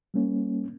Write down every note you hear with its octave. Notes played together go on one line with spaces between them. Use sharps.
G3 A#3 C#4